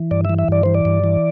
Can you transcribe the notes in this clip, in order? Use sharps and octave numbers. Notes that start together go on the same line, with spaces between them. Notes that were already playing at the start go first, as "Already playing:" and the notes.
Already playing: E3
G2 D5
E5
E3
E5
G2 D5
E3 C5
D5
G2
E3